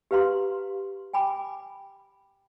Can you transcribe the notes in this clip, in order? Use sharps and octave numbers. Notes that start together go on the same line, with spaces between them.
G4 B4 F5 A#5 C6
G5 G#5 B5 D6